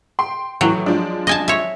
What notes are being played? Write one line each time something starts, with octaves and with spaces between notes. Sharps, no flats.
G5 C6
A2 E3 F#3 G5
F3 G#3 D4
D#5 G#5 A5
C#5 E5